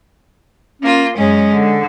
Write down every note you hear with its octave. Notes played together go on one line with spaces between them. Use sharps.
A#3 C#4 F4
F#2 G#3 C#4 G#4
D3